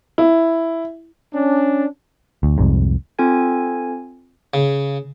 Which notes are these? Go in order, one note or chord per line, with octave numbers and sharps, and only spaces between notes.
E4
C#4 D4
D2
C2 F2 G#2
C4 F4 A4 G#5 G#6
C#3